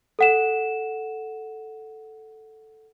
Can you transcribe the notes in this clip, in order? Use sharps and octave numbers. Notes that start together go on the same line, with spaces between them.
A4 F#5 E7